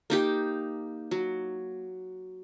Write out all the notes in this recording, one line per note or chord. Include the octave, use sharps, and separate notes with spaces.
A#3 D#4 G4
F#3